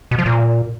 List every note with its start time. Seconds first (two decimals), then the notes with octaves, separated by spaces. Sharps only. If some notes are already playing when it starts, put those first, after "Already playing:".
0.11 B2
0.19 F3
0.26 A#2